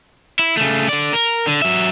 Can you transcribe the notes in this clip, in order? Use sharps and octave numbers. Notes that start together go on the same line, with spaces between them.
E4
C#3 A3
D3 D5
A#4
D3
F#3 E5